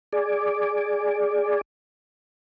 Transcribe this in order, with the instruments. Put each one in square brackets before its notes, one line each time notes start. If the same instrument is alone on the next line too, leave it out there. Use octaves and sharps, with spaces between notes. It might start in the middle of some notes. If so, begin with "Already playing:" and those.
[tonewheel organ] G#4 D5